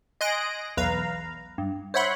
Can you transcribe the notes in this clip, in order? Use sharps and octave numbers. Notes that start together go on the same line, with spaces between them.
D#5 G#5 C6 F#6 A#6 D7
B1 E2 B4 F5 A#5
G2
C5 C#5 E5 F#5 B5 C6